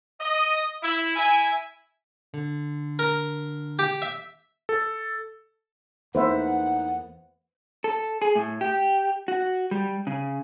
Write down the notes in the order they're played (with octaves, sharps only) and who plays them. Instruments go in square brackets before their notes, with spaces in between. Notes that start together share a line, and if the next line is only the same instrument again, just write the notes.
[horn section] D#5
E4
E4 G#5
[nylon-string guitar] D3
[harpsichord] A#4
G4
E5
[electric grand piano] A4
[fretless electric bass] E2 A3 A#3 [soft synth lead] D#4 [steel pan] B4 C5 E5 [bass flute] F#5
[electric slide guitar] A4
G#4
A2
G4
F#4
G3
C#3